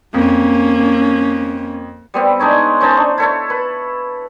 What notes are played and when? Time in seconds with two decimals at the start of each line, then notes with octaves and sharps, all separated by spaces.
0.14 F2 A#3 C#4
2.14 G3 B3 C4
2.39 G#3 D4 D#4 C#5
2.80 C#4 D#4 C5 A5
2.97 D4
3.18 E4 A4 C#5
3.50 B4